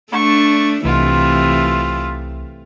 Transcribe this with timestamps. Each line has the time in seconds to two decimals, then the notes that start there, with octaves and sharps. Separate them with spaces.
0.12 A3 D4 C#6
0.85 C2 C3 E3 A3 F4